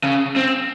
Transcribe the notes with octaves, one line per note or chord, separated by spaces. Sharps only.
C#3
C4